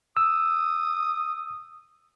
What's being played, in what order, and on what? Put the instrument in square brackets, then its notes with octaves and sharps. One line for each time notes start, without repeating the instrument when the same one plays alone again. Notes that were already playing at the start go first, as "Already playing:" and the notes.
[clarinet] D#6 [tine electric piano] E6